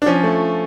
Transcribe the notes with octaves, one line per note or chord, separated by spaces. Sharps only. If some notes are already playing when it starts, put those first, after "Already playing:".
D4
F3 C#4
A3